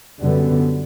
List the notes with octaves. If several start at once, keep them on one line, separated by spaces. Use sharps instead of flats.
F#2 D3 G3 B3